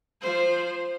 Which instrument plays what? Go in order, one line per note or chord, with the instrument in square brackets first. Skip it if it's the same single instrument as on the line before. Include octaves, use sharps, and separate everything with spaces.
[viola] F3 C5